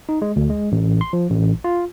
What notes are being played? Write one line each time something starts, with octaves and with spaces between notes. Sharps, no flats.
D#4
G#3
D2
G#3
A1
C6
F3
A1
F4